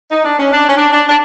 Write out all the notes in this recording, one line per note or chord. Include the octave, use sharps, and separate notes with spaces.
D#4
D4
C#4
D4
C#4
D4
D4
D4